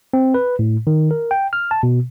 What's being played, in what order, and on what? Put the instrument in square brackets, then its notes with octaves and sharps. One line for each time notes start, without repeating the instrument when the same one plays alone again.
[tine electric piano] C4
B4
A2
D#3
A#4
G5
F6
A5
B2